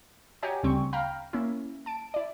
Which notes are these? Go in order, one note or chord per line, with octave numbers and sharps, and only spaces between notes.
F#4 G4 C#5 D#5 G#5 A#5
D2 C#3 G3 C4 G5 C#6
F5 G5 A#5 B5 F6
A#3 C#4 E4
A5 D7
E4 D5